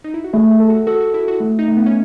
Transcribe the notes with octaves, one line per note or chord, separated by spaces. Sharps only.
D#4
E4
F#4
A3 G#4
G#4
A4
F#4
F#4 A4
F#4
E4 A4
F#4
A3
D#4
A3
B3
C#4